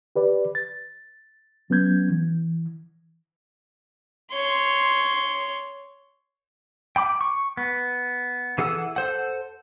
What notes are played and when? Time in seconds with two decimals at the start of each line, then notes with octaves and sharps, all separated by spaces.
0.16 G4 B4 D5
0.55 A6
1.70 F#3 B3 C#4 G6 G#6
2.11 E3
4.32 C#5 C6
6.96 G5 B5 D6
7.21 C#6
7.57 B3
8.58 E3 G#4 A4 F#5 E6
8.96 A4 C5 F#5